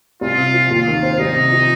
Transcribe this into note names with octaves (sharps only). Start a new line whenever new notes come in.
C2 F4
C3
F3
D#2 F4
D#3
C4
C2 D#4
C3
F3